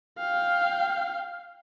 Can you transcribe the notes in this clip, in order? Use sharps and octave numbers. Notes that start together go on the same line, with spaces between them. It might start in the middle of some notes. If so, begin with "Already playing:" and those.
F5 G5